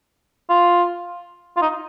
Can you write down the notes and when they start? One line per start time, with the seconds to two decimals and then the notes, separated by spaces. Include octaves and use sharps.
0.50 F4
1.57 F4
1.62 D#4